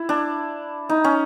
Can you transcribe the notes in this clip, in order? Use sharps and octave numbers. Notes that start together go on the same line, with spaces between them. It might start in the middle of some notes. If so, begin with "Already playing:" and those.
Already playing: E4
D4
D#4
C#4